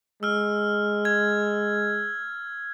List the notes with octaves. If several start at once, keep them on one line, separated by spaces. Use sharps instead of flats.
G#3 E6 F6
G#6